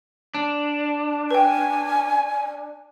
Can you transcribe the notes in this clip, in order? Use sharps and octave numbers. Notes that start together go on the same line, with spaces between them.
D4
B4 G5 G#5